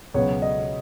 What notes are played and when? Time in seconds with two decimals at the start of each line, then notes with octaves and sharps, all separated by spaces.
0.14 C#2 B2 F#3 B3 C#5
0.42 D#5